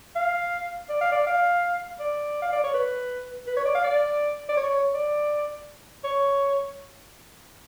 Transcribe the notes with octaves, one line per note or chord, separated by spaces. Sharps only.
F5
D5
F5
D5
F5
D5
F5
D5
C#5
B4
B4
C#5
D5
F5
D5
D5
C#5
D5
C#5